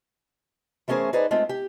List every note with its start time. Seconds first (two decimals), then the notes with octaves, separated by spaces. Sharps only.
0.88 E3 A3 C#4 G#4 A#4 C5
1.13 D#4 G#4 B4 C5 D5 D#5
1.31 G#3 A3 C4 F4
1.49 G4